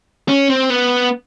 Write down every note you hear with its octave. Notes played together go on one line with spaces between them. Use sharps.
C#4
C4
B3